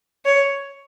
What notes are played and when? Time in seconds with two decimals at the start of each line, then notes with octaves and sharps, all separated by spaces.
0.25 C#5